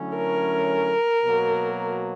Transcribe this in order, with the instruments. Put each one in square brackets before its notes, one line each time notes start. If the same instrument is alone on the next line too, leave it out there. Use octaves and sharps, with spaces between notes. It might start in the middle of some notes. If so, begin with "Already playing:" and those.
Already playing: [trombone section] D3 F#3 A3 C#4 E4
[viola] A#4
[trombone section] B2 F#3 A#3